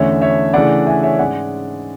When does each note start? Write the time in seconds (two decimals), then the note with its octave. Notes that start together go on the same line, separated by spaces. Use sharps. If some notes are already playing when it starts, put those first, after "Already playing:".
Already playing: E2 D3 A3 C#4 C#5 E5
0.22 C#5 E5
0.54 C#3 E3 A3 D4 D5 F#5
0.87 E5 G#5
1.03 C#5 E5
1.19 G#2 G#3 C#4 D5 F#5